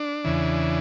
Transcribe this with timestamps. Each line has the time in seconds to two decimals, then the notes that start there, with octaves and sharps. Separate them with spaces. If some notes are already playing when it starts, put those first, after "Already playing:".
Already playing: D4
0.24 E2 C#3 E3